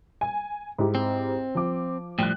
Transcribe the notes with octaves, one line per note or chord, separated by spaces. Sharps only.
G#5
G#2 E4 G4
C4
F3 D6
A2 F3 G3 G5 F#6